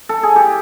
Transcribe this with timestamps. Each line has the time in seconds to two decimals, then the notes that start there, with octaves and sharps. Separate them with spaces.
0.09 A4
0.23 G#4
0.36 G4